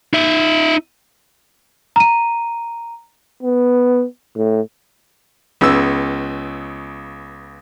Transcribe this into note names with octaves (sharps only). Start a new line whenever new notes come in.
D#4 E5
A#5 D#7
B3
A2
C#2 C#3 B3 E6